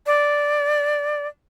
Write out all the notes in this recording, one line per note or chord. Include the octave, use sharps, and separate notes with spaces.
D5